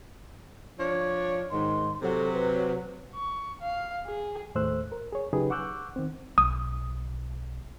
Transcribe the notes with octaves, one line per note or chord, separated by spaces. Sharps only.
F3 D4 C#5
G#2 D#3 C6
C3 F#3 A4
B4
C#6
F5
G#4
D#2 A2 A3 C5 E6 F#6
A#4
G#4 C#5
C#3 F#3 D#4 G4 G#4 B4
F#5 C#6 D6 E6 F#6 G6
D#3 C4
B1 D#6